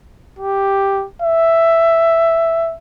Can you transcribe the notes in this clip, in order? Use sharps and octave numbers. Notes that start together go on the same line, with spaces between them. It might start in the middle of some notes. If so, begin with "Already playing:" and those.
G4
E5